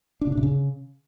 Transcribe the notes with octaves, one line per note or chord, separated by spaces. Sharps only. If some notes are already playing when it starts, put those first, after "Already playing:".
D4
C#3
D4
C3
C#3